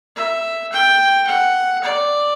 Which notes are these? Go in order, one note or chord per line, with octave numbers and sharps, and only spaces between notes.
E5
G5
F#5
D5